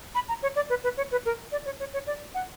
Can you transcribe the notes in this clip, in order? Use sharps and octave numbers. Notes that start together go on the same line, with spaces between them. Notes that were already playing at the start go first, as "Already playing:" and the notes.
B5
A#5
C#5
D5
B4
B4
C#5
B4
A#4
D5
C#5
C#5
C#5
D5
F#5